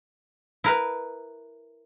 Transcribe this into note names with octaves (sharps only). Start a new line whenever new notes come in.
E4 A#4 B4